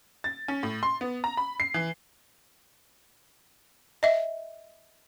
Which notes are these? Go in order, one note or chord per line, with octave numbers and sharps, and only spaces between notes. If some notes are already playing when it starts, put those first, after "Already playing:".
A6
C#4
A2
C6
B3
A#5
B5
C7
E3
D#5 E5